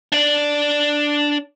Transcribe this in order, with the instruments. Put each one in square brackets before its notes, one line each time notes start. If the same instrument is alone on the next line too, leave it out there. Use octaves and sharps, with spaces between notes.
[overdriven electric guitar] D4 D5